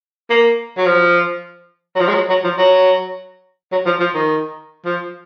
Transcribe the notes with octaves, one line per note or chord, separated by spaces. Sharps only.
A#3
F#3
F3
F#3
F3
G#3
F#3
F#3
F3
F#3
F#3
F3
F3
D#3
F3